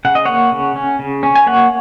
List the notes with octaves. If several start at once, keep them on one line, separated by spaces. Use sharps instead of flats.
C#3 F#5
D#5
A#3 C#5 F#5
C#3
C#4
C#3
C#4
G#5
A#3 C#5 F#5